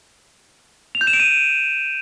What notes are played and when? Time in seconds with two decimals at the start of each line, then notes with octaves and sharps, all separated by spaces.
0.95 F7
1.01 G6
1.07 E7
1.13 D7
1.20 D#7